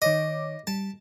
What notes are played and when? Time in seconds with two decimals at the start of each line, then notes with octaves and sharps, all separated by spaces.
0.02 D#3 C#5 D#5 D6
0.67 G3 A5